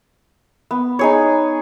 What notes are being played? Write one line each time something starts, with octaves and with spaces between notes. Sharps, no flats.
B3
D#4 G#4 C#5